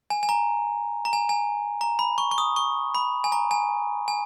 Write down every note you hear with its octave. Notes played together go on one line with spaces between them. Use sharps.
G#5
G#5
A#5
A#5
G#5
G#5
A#5
B5
C#6
C#6
D#6
C#6
B5
G#5
A#5
G#5
G#5